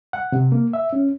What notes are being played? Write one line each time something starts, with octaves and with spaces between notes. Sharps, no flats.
F#5
C3
A#3
E5
C#4